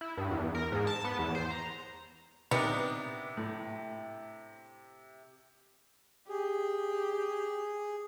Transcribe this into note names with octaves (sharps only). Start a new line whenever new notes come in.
E4
G2
E2
A#4
G#2
A5
B3
E2
C5
A#5
C3 B3 D4 D#4 A#4 G5
A2
G4 G#4